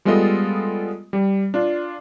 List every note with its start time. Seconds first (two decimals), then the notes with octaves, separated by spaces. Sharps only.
0.05 G3 G#3 B3 F4 A4 D#5
1.13 G3
1.54 D4 F4